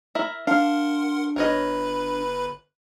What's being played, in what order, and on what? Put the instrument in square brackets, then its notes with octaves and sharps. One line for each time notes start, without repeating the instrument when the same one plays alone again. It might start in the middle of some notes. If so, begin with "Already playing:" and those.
[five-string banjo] E4 A#4 E5
[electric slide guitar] D4 A5 [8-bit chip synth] A#4 F#5 C6 [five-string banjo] F5
[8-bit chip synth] G1 B4 B5 [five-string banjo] A#4 C#5 D#5